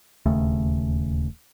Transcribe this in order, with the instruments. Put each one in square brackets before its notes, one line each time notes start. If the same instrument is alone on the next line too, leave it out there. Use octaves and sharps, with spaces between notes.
[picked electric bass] D1 D#2 C#3 A3